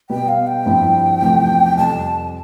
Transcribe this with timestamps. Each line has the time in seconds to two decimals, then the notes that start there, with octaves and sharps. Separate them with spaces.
0.10 B2 G3 B3 G5
0.28 F5
0.47 G5
0.66 G2 F3 C4 E4
1.22 E2 C3 F3 A3
1.77 F2 C3 G3 A5